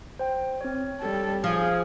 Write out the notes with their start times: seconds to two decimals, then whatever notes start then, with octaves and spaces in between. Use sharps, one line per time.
0.19 C5 G5
0.61 C4 C#5
1.01 G3 A4
1.44 F3 G#4